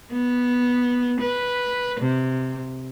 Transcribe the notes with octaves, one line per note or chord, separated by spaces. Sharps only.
B3
B4
C3